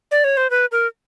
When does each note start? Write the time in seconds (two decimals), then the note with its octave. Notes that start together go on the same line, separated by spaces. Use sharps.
0.11 D5
0.24 C#5
0.37 C5
0.50 B4
0.72 A#4